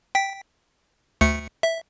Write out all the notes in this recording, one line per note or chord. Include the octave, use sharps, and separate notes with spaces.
G5 B6
D2 A3 C#7
E5